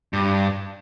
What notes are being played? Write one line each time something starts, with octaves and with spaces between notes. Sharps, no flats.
G2